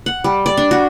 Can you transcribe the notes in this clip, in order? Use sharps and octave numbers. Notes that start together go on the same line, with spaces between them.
F#5
G3
D5
D4
F#4